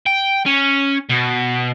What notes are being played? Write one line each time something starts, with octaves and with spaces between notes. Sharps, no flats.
G5
C#4
B2